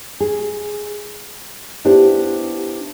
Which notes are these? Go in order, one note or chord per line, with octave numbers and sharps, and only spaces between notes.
G#4
B3 D4 E4 G4 C5